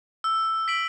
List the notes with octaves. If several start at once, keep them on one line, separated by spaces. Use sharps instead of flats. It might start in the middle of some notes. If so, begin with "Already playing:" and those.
E6
B6 D7 F#7